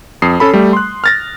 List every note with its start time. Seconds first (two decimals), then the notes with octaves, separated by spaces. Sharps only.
0.22 F2 D#6 C7
0.40 C#4 A4 B5
0.53 G3 A3
0.73 C6 F#6
1.04 F6 A6 A#6